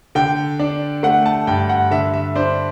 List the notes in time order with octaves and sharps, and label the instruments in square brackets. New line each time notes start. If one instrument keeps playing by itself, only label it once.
[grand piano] D3 G5
D4
A3 F#5
A5
G2 G5
F#5
D3 E5
E5
D4 C5